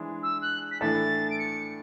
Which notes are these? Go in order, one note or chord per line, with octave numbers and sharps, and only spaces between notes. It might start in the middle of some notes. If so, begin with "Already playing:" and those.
Already playing: E3 G#3 D4 G#4
E6
F#6
B6
A2 E3 A3 D4 A4 A6
D7
C#7